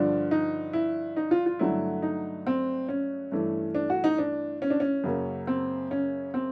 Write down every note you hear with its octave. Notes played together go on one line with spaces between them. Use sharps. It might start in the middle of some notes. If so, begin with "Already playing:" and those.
Already playing: G2 D3 F3 D4
D#4
E4
D#4
F4
F4
G2 D3 F#3 A3 E4
D#4
C4
C#4
G2 E3 A3
D4
F#4
D#4
D4
C#4
D4
C#4
F#2 C#3 F#3 A#3
C4
C#4
C4